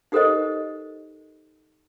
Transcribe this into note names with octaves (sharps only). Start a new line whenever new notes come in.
D#4 G4 A4 A#4 C5 D#5